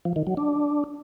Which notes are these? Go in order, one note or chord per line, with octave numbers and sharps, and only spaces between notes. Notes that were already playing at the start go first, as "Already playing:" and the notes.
F3
D#3
F#3
D4